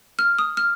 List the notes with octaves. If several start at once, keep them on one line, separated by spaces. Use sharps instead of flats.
F6
D#6
F6